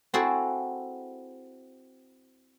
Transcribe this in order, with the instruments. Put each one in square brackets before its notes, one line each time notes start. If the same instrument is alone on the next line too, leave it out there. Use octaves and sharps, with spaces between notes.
[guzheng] C4 E4 F#4 G#4 A4 C5